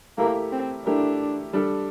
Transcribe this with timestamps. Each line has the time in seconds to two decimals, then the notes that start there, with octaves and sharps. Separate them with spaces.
0.18 A3 A#3 E4 G4 A#4
0.52 C4
0.86 A3 D4 E4 G4 A#4
1.53 G3 D4 A4